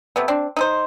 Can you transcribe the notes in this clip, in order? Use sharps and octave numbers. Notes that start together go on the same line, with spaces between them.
C3 A3 B3
C4 D4
D#4 A4 C5